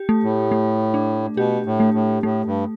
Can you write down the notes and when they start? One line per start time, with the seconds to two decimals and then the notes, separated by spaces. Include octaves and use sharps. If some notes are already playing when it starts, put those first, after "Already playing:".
Already playing: G4
0.09 A3
0.23 A2
0.52 A3
0.94 D4
1.37 B2 G4
1.66 A2
1.80 A3
1.94 A2
2.23 A2 A3
2.45 G2